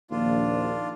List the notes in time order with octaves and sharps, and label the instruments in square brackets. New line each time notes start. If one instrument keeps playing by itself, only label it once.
[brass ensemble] A#1 D#2 [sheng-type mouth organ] D4 F4